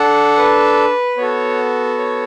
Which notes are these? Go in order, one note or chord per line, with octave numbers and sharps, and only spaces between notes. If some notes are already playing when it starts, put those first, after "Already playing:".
Already playing: D4 A4 F#5
B4
B3 F#4 A4 C#5
C#5